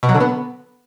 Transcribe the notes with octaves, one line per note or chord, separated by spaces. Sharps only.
B2
F#3
D3
B3